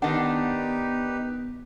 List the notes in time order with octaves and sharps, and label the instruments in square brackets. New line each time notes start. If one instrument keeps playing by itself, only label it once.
[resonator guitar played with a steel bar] D#3 D4 [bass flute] B3 [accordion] D#4 G4 B4 [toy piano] F#5